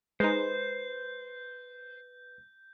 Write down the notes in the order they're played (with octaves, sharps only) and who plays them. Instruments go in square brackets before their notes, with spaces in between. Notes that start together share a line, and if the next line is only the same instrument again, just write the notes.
[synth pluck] G#3 D#4 [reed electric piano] B4 [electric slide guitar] C5 [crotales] G6